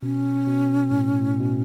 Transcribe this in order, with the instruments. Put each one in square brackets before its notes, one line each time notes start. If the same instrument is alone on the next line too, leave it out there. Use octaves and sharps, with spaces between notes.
[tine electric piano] B2 [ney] C#4
[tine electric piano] B2
A2
A2
B2